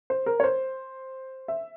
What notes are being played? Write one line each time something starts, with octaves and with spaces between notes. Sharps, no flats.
C5
A#4
C#5
C5
E5